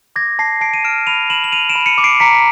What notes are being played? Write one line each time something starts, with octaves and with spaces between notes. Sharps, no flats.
D6 G#6 A#6
A5 A#6 C7
A5 C7 D7
D#7
F6 D7 E7
B5 D#7 F7
B5 E7 F#7
F#7
F6 D#7 F7
D7 E7
B5
C#7 D#7
D6
C7 D7
A#5 B6 C#7